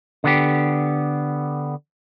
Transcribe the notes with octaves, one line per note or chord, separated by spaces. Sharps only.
D3 B3 G4